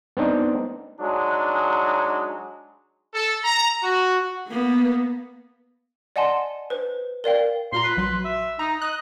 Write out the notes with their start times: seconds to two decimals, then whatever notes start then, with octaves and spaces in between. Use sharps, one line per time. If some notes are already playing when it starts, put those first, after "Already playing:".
0.17 B3 C4 D4 D#4
1.00 F#3 G#3 D4 D#4
3.14 A4
3.44 A#5
3.83 F#4
4.48 A#3 B3
6.16 D5 D#5 F#5 G#5 A5 C6
6.70 B4 C5
7.24 A#4 D5 F5 G5
7.72 A#2 F4 A#5 C6
7.84 B4
7.97 A#1 F#3 C6
8.25 E5
8.59 D#4 A#5
8.81 D#5 F#6